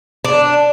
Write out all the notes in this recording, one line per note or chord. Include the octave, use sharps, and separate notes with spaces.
D4